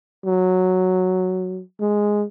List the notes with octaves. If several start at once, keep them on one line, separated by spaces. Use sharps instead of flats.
F#3
G#3